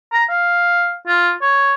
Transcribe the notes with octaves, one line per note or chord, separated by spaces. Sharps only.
A#5
F5
F4
C#5